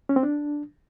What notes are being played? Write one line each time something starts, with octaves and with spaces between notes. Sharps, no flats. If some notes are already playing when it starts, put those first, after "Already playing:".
C#4
C4
D4